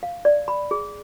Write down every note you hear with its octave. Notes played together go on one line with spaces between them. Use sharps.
F5
D5
B5
G#4